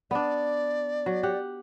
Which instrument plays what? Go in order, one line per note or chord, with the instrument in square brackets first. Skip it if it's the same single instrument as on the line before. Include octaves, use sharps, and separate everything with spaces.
[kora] B3 D4 [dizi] D5
[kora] F#3
G4 F#5